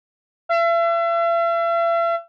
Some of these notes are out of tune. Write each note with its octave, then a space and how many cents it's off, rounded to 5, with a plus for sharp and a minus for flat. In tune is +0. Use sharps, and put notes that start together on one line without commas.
E5 +40